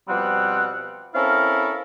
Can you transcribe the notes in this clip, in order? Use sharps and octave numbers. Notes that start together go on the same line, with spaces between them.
B2 F3 G3 C4 F#5
C4 C#4 E4 A4 A#4 F5